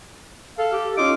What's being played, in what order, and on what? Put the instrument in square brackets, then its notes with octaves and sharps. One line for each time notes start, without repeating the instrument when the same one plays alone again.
[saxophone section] A4 [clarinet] F5
[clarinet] G4
[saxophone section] C#4 D#4 F4 [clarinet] D6